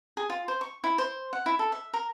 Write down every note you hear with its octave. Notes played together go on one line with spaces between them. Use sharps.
G#4
F4
C5
C#6
E4
C5
F#5
E4
A4
E5
A#4